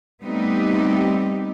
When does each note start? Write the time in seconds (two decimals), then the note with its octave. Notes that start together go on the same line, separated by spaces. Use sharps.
0.23 G3 A3 B3 C4 D#4 G4